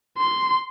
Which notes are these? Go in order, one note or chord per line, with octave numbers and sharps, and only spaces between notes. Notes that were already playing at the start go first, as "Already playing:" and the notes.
C6